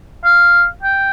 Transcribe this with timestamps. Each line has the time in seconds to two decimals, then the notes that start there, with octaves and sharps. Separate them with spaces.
0.24 F5
0.83 G5